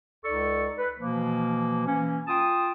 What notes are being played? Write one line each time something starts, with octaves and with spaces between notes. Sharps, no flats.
C#2 D#4 A4 D5 C#6
B4
B2 E3 F3 A#3
E3 A#3 C#4
F4 G5 A5 D#6